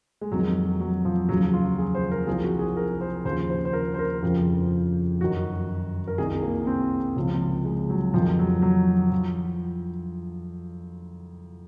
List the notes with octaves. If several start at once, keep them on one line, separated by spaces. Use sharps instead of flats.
G#3
F2 C3 D#3 F#3
F#3
F3
D#2 C#3 F3 F#3
F4
G#4
C5
A#4
C2 C3 F3 G#4
F#4
G#4
A#4
C5
D#2 C#3 F3 C5
C5
C5
A#4
C5
A#4
F2 C#3 F3
F#2 D#3 F#4
A#4
C2 C3 D#3 G#4
A#3
C4
C#2 C3 F3
G#3
F#3
F2 D#3 F3
F#3
F#3
F3